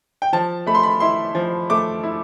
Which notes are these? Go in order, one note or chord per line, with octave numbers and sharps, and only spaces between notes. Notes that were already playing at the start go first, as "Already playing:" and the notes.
G5
F3 A5
A3 B5
C6
B5
E4 C6
F3
A3 D6
E4